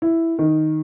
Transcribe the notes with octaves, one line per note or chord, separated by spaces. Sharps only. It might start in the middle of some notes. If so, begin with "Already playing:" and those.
E4
D#3